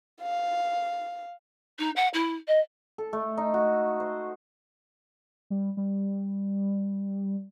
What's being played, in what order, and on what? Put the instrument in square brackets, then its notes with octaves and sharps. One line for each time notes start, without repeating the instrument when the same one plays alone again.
[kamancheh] F5
[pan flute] D#4
F#5
E4
D#5
[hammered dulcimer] A4
A3
D#4
F#4
C5
[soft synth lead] G3
G3